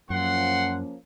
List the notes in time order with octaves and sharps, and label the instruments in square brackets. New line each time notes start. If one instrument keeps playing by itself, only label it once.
[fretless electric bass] F#2 [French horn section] F3 A#3 C#4 [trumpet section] F#5 [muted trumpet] C6